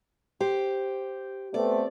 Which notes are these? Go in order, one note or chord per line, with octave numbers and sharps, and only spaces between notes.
G4 C5
A3 B3 C4 D5